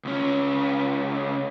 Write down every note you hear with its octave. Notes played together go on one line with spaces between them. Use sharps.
C#2 C#4